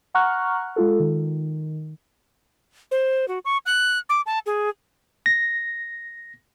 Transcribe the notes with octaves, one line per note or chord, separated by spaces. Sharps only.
F#5 A#5 C#6 F6 F#6
G#3 F4 A4
D#3
C5
F#4
C#6
F#6
D6
A5
G#4
A#6